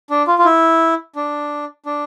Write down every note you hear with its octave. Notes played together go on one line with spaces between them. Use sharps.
D4
F4
F4
E4
D4
D4